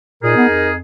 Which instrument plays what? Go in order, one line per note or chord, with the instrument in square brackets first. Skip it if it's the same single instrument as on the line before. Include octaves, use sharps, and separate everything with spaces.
[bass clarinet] A#2 [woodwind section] D#4 G#4 A#4
[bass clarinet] B3
F2